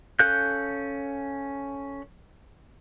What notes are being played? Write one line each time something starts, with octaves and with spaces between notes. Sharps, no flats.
C#4 A4 F5 F#6 G6